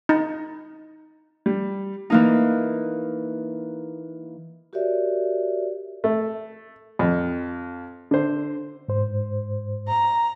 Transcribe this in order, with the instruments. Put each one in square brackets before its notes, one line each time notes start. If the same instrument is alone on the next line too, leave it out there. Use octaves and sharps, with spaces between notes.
[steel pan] D#4
[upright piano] G3
[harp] E3 A#3 D#4
[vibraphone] F#4 G4 A#4 C#5 D5 E5
[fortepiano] A3
F2
D3 C5
[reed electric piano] G#2 C5
[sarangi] A#5